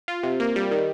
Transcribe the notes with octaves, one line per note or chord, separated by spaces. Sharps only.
F4
C3
A#3
G3
D#3